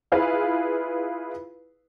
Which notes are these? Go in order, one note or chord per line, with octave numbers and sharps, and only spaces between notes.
E4 F4 G#4 B4 F5